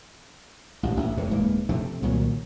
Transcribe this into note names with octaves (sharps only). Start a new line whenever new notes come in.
A1 G2
A1
E1 F2 C3
D1 G#2 E3 A#3
C3 F3 A3 C4
C2 A#2 D#3 F#3